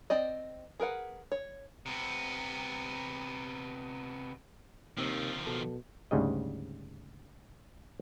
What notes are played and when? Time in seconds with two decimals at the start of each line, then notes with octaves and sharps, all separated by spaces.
0.10 C4 D5 D#5
0.80 G#4 A#4 B4 F#5
1.32 C#5
1.86 C3 B3
4.98 D#2 C3 D#3 F3 C4 E6
5.46 B2 A4
6.11 D2 G#2 C#3 G3 D#5